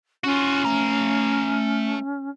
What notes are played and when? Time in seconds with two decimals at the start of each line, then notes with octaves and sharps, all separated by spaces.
0.24 C#4 F4 F#4
0.65 A3 A#5